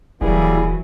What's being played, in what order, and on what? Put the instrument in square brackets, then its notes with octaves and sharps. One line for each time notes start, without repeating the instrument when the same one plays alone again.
[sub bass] D#1 [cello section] E3 F#3 [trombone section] G3 A#3 G#4 [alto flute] E4